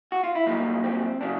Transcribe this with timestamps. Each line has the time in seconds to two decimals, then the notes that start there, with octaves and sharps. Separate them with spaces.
0.12 F#4
0.24 F4
0.35 E4
0.46 C2 A#2 F#3 D#4
0.84 C4
1.21 C#3 F#3 D4